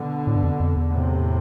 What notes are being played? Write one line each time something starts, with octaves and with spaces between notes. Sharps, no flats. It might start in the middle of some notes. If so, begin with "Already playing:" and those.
Already playing: B2 D3
A2
G2
F2
F2
E2
A2 C3